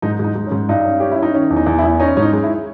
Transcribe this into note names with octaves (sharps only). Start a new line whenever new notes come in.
G#2 D#4
G#2 D#4
G#2
C#4
G#2
G2 D#4
C#4
C#4 G4
E4
C#4 D#4
D#3 C#4
E2
D#4
E2
E4
E2
C#4 D#4
G#2 C#4
D#4
G#3
E4